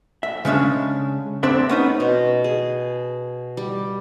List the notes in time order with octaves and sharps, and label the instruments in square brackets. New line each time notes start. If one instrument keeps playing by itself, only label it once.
[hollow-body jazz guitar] E5
C#3 G#3 C#4 D4
C4 D4 D5 E5
B3 C#4 D#4
[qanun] B2
G#4
G3